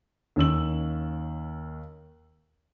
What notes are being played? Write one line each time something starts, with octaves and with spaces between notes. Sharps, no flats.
D#2 C#4 E6 F#7